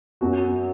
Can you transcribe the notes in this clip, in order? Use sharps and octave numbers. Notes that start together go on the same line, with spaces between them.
F#2 F#4